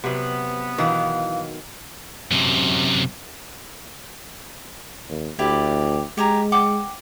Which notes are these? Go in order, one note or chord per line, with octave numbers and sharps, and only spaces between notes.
C3 F#3 B3
B2 D#3 E3 F#3 F5
F#2 C3
D#2
D2 E4 G4 D5
G#3 G4 G#5 A#5
F#5 G5 D6